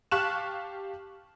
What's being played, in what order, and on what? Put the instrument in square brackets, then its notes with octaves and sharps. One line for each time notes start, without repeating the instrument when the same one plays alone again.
[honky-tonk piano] G4 F5 A5 C#6 F#6 E7